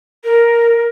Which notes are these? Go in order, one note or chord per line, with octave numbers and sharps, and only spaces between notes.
A#4